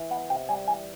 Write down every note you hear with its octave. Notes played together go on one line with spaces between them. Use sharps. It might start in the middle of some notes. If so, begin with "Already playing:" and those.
Already playing: E3
B3 F#5
C3 G5
G3 G#5
E3 G#5